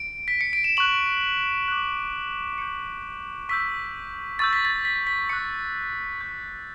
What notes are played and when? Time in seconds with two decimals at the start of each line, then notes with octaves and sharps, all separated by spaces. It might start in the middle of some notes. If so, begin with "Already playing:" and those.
Already playing: D7
0.28 B6
0.41 C#7
0.53 D7
0.64 E7
0.77 C#6 F#6 F#7
1.68 D6 F#6
2.58 C#6 G6 C#7
3.49 C#6 E6 G6 B6
4.39 C#6 E6 G6 A6
4.53 B6
4.65 A6
4.85 B6
5.07 B6
5.29 C#6 F#6 C#7
6.20 C#6 G6